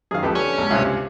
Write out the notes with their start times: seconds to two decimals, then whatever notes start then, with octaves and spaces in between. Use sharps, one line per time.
0.11 F#2 D#3 G#4 F5
0.23 C#2 F3 B3 G4 A4
0.35 D3 C#4 C#7
0.58 B1 G#2
0.71 C#2 G2 C3 E5 E6 F#6